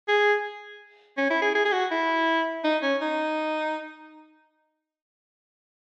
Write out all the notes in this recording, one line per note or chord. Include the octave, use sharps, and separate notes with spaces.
G#4
C#4
E4
G#4
G#4
G#4
F#4
E4
D#4
C#4
D#4